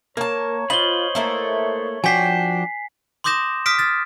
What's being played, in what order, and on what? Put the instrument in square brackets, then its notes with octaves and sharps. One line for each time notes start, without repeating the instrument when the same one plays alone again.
[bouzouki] A#3 A5 [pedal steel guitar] A#4 [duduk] C#5
[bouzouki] F4 [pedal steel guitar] C5 D#5 B5 [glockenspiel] F#7 G7
[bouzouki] A3 A#3 E4
[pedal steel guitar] F3 G5 [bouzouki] D4 F#4 [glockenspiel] G#5 B6 C7
[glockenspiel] C6 D6 D#6 G6 A#6 E7
D#6 F6 B6 D7
F6 A6